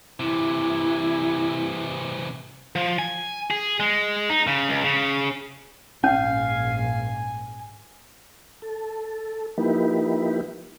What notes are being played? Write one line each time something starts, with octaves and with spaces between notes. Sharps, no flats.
C3 E3 E4
F3
G#5
G#4
G#3
D#4
C#3
C#2
C#3
A#1 G#2 C#4 F5 G#5
A4
F3 A#3 D#4 E4 G4 B4